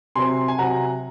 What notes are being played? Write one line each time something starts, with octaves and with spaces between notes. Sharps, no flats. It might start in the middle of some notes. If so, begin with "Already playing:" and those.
C3 F#3 C4 G#5 C6
G#5
C3 F#3 C4 F#5 A#5